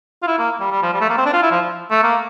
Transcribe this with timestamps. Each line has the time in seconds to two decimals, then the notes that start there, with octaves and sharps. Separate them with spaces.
0.23 F4
0.27 E4
0.39 A#3
0.60 G3
0.71 G3
0.82 F3
0.93 G3
1.01 A3
1.09 A#3
1.18 C4
1.26 D4
1.33 F4
1.42 E4
1.51 F3
1.91 A3
2.03 A#3